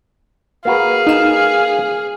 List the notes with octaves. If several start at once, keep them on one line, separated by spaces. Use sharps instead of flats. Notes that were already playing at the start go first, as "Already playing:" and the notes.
A#3 F#4 G#4 B4 F5
D#4 E7